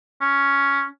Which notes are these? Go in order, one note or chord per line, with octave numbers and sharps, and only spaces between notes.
C#4